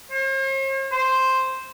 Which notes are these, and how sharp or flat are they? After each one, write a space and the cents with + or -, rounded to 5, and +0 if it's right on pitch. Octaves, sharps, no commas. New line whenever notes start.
C5 +45
C5 +0